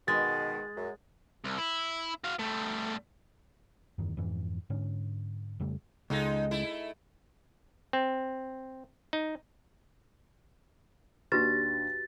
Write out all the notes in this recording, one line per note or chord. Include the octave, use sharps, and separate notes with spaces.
B2 D#3 G#3 A6
F#2
C2
E4
F#4 F5
G3 A3
F#1 E2 G2 D#3
F2 G#2 E3
G#2 D3 C#4
F2 C#3 G3 A3
C#2 G#3 D#4 A4
A3 E4
C4
D#4
D#2 D4 F#4 G4 B4 A6 A#6